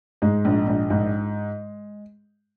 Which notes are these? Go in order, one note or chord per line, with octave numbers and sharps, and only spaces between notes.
G#2 G#3
A#1
A#1
G#2